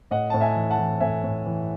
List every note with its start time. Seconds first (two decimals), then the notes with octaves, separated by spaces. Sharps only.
0.11 A2 D#5 F#5
0.30 A2 A5
0.40 E5 G#5
0.55 E3
0.71 F#5 A5
0.78 E3
1.00 A2 E5 G#5
1.23 A2
1.46 E3